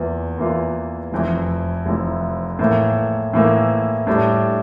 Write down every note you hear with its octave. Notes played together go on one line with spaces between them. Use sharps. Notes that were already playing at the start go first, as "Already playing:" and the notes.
Already playing: E2 E3 A#3 F4
E2 E3 A#3 F4
F1 F2 E3
F1 F2 E3
A2 E3 A#3
A2 E3 A#3
A2 G3 D4